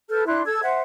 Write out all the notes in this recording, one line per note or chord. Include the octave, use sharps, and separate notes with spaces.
A4 B4 F6 G6
D4 E4 C6 F#6
A4 E6 G#6
C5 E5 F#5